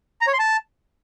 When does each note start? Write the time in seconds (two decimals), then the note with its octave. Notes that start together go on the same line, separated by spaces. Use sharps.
0.21 A#5
0.27 C#5
0.33 C6
0.39 A5